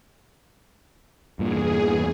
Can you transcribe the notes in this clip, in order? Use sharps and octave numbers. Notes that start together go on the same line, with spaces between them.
E2 G2 A#2 G#4